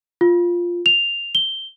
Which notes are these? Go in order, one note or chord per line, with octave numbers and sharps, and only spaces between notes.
F4
F7
G7